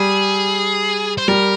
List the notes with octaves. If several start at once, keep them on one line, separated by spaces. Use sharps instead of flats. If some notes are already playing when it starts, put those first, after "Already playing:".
Already playing: G3 G#4
C5
G3 A#4